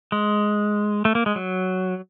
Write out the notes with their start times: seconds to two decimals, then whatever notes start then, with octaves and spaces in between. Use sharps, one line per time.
0.12 G#3
1.05 A3
1.15 A#3
1.26 G#3
1.36 F#3